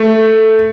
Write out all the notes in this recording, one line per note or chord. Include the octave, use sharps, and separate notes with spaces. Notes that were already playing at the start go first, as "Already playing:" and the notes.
Already playing: A3